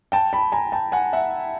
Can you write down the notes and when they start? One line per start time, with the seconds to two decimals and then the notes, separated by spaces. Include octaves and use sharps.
0.12 G5 A5
0.33 A5 B5
0.52 G#5 A#5
0.72 G5 A5
0.92 F#5 G#5
1.13 E5 F#5